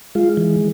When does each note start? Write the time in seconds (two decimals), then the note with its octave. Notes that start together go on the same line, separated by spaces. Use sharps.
0.15 G#3 F4
0.37 E3